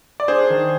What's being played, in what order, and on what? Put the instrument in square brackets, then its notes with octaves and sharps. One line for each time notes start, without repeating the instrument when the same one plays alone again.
[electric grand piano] D5
D4 G#4 C5
D#3